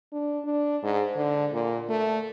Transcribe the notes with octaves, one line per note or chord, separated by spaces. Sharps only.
D4
D4
G#2
D3
A#2
A3